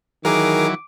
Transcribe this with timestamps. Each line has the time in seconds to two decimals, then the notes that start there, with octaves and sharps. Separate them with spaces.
0.25 D#3 E3 F#3 G#4 A#4 D6